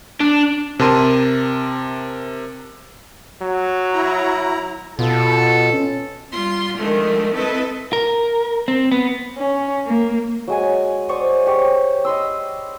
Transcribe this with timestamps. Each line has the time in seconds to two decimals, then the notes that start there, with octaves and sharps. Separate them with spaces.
0.20 D4
0.79 C3 A#4 A5 C6 D#7
3.42 F#3
3.93 E4 A#5
4.99 B2 F4 A4
5.73 C#4
6.31 G3 F4 C6
6.77 D3 D#3 F3 G#3 A3
7.33 C4 E4 A4 B4 D#5
7.93 A#4
8.68 C4
8.92 B3
9.38 C#4
9.87 A#3
10.47 F#3 G#3 G#5
11.09 C5 D5 C#6 D#6
11.46 G4 C5 C#5
12.05 D#5 B5 C6 E6